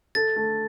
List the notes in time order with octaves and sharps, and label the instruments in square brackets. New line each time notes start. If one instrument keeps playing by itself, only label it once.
[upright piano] A4 [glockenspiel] A6
[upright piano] A3